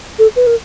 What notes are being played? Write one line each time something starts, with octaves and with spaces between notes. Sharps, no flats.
A4
B4
A#4